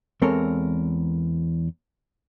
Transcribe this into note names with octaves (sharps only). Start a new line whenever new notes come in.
E2 G#3 C4 A4 A#4 C#5